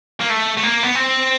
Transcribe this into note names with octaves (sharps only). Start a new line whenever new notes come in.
A#3
A3
A3
A#3
B3
C4